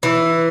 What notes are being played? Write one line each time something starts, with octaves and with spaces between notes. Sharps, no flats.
E3